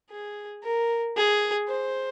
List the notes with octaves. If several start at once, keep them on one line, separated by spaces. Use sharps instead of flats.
G#4
A#4
G#4
C5